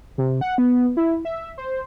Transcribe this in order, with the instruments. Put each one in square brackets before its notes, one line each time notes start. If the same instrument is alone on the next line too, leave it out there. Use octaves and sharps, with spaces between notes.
[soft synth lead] C3
F#5
B3
E4
E5
C5